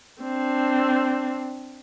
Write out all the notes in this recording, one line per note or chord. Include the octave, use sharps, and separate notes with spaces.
C4 D4